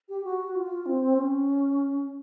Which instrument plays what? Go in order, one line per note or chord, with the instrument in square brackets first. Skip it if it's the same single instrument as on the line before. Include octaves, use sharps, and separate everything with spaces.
[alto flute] G4
F#4
F4
C4
C#4